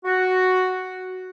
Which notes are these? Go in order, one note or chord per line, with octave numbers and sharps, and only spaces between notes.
F#4